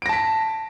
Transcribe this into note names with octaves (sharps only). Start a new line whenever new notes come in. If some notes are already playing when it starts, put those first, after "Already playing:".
A5 A#6 B6 D7